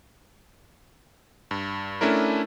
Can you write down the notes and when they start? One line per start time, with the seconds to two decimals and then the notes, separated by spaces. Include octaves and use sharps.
1.51 G2
2.01 A3 C#4 D4 E4 A#4